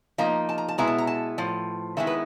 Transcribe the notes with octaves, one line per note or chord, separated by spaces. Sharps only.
F3 A#3 D#4 A#5
A5
A#5
A5
B2 G#3 B3 E4 A#5
A5
A#5
A5
A2 F3
D#3 G#3 B3 E4 E5
B4